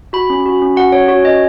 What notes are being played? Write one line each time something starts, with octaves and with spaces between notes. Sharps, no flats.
F#4 B5
C#4
F#4
C#4
F#4 F#5
C#4 C#5
F#4 C#5
C#4 D#5